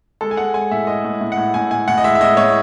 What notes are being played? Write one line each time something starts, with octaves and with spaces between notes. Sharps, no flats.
G#3 A4
G#5
G#3 F#5
G#3 G#5
A2 E5
G#3 D#5
A2
A2
F#5
A2
A2 G#5
A2 G#5
A2 F#5
D#5
G#3 E5
E5
A2 D#5
A2 C#5